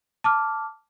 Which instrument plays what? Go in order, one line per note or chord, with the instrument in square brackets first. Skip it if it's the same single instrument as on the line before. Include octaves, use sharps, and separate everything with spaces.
[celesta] A5 D6 F6